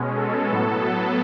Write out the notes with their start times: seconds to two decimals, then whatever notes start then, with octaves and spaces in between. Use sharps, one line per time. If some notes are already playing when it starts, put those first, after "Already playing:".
Already playing: B2 G#3 C#4
0.16 A4
0.48 A2 F#3 B3 A4